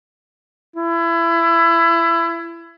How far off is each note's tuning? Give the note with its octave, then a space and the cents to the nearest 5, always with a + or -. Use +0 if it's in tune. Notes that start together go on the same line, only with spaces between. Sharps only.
E4 +25